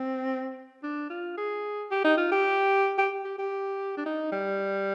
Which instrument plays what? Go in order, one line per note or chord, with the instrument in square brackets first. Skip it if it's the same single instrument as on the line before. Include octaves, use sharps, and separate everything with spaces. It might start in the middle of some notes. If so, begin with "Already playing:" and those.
Already playing: [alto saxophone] C4
D4
F4
G#4
G4
D#4
F4
G4
G4
G4
G4
D4
D#4
G3